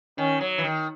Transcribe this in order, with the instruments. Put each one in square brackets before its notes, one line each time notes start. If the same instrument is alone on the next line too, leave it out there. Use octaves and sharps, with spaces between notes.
[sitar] D#3 [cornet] C#4
[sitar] F#3
E3
D#3